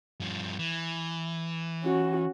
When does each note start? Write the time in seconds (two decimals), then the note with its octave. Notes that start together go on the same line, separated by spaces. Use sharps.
0.20 G2 F3
0.59 E3
1.83 C#4 F#4